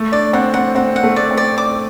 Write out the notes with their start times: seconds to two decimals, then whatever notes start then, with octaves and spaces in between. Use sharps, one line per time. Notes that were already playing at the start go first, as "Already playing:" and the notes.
Already playing: A3
0.12 D4 D5
0.33 C4 F#5
0.54 C4 F#5
0.75 C4 F#5
0.96 F#5
1.03 A3
1.16 D5
1.31 C4
1.37 D5
1.58 D6